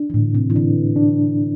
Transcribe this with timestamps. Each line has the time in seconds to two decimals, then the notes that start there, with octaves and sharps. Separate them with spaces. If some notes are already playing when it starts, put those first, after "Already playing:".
Already playing: D4
0.10 E3
0.14 A2 D3
0.35 C3
0.50 E3
0.55 D3 D4
0.96 D4